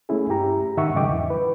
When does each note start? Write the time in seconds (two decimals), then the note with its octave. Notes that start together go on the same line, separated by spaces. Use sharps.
0.09 A3 A#3 C#4 E4 G#4
0.29 G2 G4 A#5
0.77 G#2 D#3 E5 F#5 C#6
0.95 G#2 C#3 F#3 D#5 G5 D6
1.08 E2 E3
1.30 B4